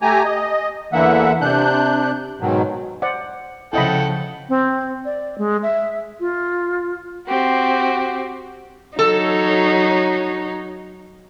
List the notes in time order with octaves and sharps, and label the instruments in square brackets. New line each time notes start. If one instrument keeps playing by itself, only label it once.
[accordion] A3 G4 G#5 A#5
D#5
E2 D3 E3 A#3 E5 F#5
C3 D4 F#6 G6
G#2 B2 D#3 F#3
[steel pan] C5 D5 F#5
[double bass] C#3 F3 [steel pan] E4 D#5 B5 [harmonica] A4 F#5 G5
[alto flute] C4
D5
G#3
E5
F4
[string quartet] C4 F#4 G4
[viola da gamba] F#3 C#5 [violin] D#4 [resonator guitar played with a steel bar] A4